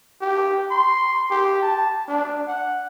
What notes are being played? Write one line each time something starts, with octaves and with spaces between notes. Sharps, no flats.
G4
C6
G4
A5
D4
F#5